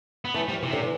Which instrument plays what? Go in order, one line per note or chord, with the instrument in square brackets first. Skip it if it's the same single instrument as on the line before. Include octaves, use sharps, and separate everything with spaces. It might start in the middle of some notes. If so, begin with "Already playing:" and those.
[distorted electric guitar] B3
[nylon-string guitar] E3 [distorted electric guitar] A3
[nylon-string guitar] F3 [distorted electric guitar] G3
[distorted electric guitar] C3 [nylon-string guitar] E3
[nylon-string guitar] D3
E3